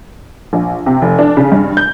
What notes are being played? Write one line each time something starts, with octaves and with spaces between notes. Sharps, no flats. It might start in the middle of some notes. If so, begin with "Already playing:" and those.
A#1
C3
F1
D4
C#3
G2
G6